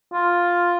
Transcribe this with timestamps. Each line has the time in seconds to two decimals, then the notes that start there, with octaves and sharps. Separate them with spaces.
0.13 F4